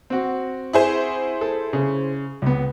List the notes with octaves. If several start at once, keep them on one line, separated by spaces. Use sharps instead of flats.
C4 F#4
E4 G#4 C5
A4
C#3
C#2 B3